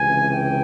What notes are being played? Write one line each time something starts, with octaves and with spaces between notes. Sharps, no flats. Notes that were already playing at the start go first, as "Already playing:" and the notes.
Already playing: C#2 C3 E3 G#5
G5